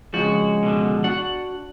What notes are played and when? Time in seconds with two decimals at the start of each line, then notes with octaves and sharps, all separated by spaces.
0.14 F2 C#3 F3 G#3 F#4
0.63 B2 D3
1.04 D4 F#4 F#5